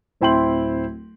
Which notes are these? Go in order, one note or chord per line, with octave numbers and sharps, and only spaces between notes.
D1 C4 E4 G5 C6 F#7